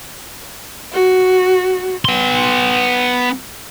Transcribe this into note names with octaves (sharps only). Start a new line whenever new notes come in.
F#4
B3 C6